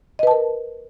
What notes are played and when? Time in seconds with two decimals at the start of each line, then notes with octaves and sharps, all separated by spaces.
0.19 D#5
0.23 B4
0.27 A5
0.31 A#4